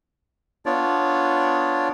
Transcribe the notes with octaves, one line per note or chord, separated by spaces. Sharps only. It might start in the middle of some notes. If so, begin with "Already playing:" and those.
B3 D4 F4 C#5 D5